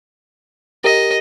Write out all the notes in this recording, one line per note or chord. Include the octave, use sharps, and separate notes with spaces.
G4 A#4 D#5